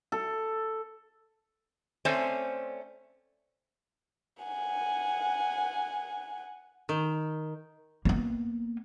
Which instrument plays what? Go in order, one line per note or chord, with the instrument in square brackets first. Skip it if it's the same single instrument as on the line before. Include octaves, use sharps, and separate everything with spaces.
[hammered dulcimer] A4
[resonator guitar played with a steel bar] A3 C4 C#4 C5 D5
[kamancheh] F#5 G#5
[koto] D#3
[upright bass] A#3 B3